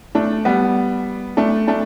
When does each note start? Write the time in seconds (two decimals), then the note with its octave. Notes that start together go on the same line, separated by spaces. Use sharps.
0.15 A3 D4
0.45 G3 B3
1.37 A3 D4
1.67 A3 D4